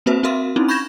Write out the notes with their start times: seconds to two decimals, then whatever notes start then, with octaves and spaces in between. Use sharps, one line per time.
0.06 A#3 C4 F#4 B4 C5 E5
0.23 C4 F#4 A#4 E5 F5 C6
0.56 C4 C#4 D#4 E4
0.68 B5 C#6 G6 G#6 A#6 E7